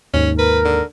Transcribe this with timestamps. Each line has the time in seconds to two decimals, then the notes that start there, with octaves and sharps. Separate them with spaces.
0.14 D#2 G#2 C#4
0.39 A#4 B4
0.65 D3